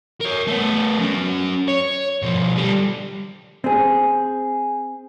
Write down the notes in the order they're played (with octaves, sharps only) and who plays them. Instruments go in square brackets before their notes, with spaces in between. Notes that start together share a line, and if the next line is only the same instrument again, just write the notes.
[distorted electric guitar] A#4 C#5
A3 B3
F#3 C#4
C#5
B2 F3
D3 G3
[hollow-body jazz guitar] C4 G#4